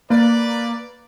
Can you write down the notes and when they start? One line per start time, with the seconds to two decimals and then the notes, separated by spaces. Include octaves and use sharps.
0.10 A#3 B4 D5